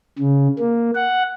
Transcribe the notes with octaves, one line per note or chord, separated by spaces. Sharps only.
C#3
A#3
F#5